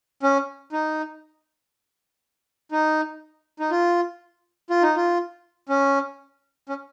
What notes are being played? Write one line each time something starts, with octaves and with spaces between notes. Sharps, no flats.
C#4
D#4
D#4
D#4
F4
F4
D#4
F4
C#4
C#4